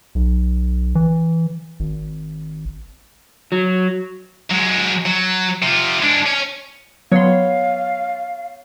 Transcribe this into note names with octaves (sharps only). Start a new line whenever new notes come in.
B1
E3
G#1
F#3
F#3 G#3
F#3
C3 F4
G#3 D4
C#4
F#3 B3 C#5 F5 C6